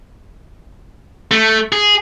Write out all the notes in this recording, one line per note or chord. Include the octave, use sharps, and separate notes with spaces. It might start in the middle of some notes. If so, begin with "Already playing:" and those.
A3
G#4